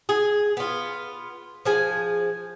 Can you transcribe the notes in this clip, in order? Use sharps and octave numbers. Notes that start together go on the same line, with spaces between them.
G#4
B3 F4
F3 G#4 G#5